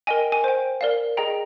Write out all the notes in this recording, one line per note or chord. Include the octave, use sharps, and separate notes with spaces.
A#4 D#5 G5 G#5
G#5
C5 G5
A#4 D5 F5
G#4 D#5 G5 A#5